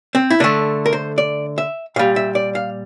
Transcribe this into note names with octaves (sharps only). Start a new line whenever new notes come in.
C4
E4
D3 A3 D4
A#4
C5
D5
E5
A#2 G3 F5
E5
D5
F5